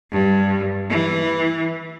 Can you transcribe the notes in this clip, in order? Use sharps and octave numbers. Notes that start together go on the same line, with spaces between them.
G2
E3